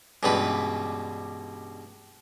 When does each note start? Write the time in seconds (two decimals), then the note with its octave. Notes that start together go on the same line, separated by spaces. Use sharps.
0.23 C#2 G2 B2 E3 B4